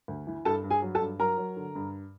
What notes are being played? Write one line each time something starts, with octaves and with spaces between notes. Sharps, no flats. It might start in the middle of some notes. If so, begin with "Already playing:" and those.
D2
E3
G2 A4 A5
G2
G#4 G#5
F#3
A4 A5
G2
F#3 A#4 A#5
F#3
D3
G2